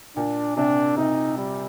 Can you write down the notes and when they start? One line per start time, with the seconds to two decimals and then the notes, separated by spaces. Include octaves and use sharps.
0.16 A#2 D4
0.56 C3 D4
0.97 C3 D#4
1.37 G3